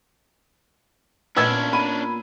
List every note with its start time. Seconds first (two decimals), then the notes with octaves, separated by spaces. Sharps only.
1.36 A#2 B3 C#4 D4 B4 E6 G#6
1.73 B5 D#7